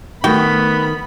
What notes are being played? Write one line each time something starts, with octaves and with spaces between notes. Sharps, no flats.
D#3 A3 B3 F#4 G5 B5